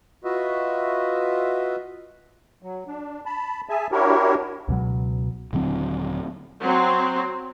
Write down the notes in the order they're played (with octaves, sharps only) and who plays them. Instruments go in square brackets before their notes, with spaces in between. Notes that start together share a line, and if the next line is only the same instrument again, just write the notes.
[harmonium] F4 F#4 B4 D#5 E5
[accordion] F#3
D4
A5 B5
G#4 E5 G#5 A5
D4 E4 F#4 G4 A#4 C#5
[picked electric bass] C#2 B2 F#3
[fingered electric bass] D#1 D3 F#3 C4
[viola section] F#3 C4